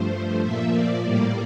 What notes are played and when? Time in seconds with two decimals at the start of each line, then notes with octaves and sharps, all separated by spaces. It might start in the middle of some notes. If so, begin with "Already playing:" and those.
Already playing: G2 F3 A3 C5
0.43 A#2 F3 A#3 E5
0.72 D5
1.02 A2 G3 A#3 D5